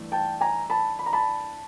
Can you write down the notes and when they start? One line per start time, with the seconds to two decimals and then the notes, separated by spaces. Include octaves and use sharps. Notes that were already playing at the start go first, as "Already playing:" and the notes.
Already playing: G2 E3 A3
0.12 G5 A5
0.41 G#5 A#5
0.70 A5 B5
0.99 B5
1.06 A#5
1.13 A5 B5